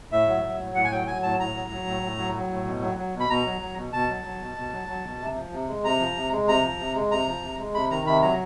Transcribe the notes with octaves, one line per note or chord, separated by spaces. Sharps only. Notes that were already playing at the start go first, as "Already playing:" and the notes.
A2 E5
F#3
F#3
A2
A2 F#5
G#5
F#3 G5
F#3 G#5
A2 A5
A2 A#5
F#3
F#3
A2
A2
F#3
F#3
A2
B2
F#3
F#3
B2
B5
B2 A#5
F#3
F#3
B2
B2 A5
F#3
F#3
B2
B2
F#3
F#3
B2
C3
F3
C3
G#3
C3 A#5
F3
C3
G#3
C3 A#5
F3
C3
G#3
C3 A#5
F3
C3
G#3
C3 B5
D#3 A#5
C3 B5
F#3 A#5